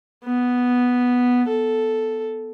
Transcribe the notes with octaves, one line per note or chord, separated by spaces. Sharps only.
B3
A4